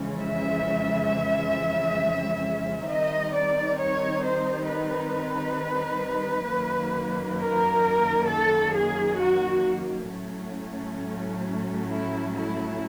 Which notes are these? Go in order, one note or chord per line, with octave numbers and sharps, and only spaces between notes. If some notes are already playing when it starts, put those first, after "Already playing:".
Already playing: F2 C#3 E3 G#3 C#4
E5
D#3 G3 C4 D#4 D#5
D5
C#5
C5
B4
F#2 D#3 F#3 A#3
A#4
A4
G#4
F#4
A2 F#3 A3 C#4
E4
E4